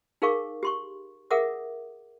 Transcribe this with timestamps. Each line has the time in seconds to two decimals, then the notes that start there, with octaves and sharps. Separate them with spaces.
0.22 D#4 G#4 A#4 F5 C#6 D6
0.63 G4 C6 C#6
1.31 G#4 A#4 E5 F#5 D6 D#6